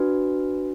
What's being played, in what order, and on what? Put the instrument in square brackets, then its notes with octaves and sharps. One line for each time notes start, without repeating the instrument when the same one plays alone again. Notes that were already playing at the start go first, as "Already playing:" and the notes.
Already playing: [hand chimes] D4 F#4 B4